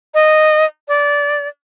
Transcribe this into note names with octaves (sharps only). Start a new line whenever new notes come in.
D#5
D5